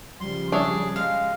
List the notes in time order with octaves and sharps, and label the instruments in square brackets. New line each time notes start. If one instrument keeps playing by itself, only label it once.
[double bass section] C#3 F3 G3 [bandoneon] C6
[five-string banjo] D4 C#5 E5 [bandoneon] G#4
[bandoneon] G#3 [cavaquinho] F5